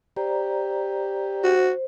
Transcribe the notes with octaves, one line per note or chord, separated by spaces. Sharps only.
G4 C5 D5 A#5
F#4 C5